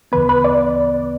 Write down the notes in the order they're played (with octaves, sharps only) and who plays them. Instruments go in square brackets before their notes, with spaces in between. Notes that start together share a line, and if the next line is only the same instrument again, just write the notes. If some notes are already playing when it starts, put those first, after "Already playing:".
[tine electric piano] D2 C#3 E3 B3 [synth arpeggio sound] B4
[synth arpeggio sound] B4
D5